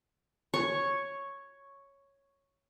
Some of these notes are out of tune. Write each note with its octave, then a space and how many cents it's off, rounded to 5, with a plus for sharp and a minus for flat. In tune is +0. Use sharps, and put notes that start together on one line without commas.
C#5 +0 C#6 -5